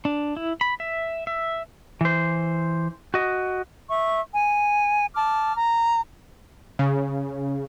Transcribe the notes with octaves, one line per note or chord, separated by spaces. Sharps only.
D4
E4
B5
E5
E5
E3 C5
F#4 D#5
E5 C#6
G#5
A5 D6 F6
A#5
C#3